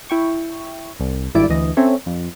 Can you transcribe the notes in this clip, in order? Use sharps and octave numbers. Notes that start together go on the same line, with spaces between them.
E4 G5 C#6
C2
G#1 G2 E4 D5 D7
D2 E3 D#5
C4 C#4 A4 C#5 E5
F2